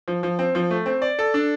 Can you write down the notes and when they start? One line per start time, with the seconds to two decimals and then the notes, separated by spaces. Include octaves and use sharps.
0.08 F3
0.23 F3
0.39 C4
0.55 F3
0.70 A3
0.86 C4
1.02 D5
1.19 A4
1.34 D4